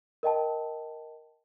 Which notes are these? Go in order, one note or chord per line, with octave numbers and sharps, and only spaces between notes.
A#4 D#5 G5 A5